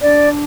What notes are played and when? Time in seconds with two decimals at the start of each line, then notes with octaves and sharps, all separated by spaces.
0.02 D4 D5